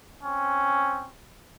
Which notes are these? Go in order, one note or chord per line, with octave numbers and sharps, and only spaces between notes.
C4 C#4